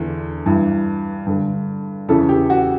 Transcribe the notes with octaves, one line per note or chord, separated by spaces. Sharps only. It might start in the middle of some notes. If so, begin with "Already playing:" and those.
Already playing: E2 D3
G2 E3
G2 D3
E2 C#3 E3 A4
G4
F#4